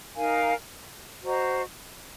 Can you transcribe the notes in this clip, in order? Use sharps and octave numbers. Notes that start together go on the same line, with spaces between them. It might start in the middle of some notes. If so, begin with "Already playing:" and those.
D#4 A#4 F5 G#5
F#4 C5 D#5 A#5